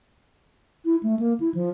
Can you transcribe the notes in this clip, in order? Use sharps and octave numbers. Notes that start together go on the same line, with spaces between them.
E4
A3
A#3
E4
F3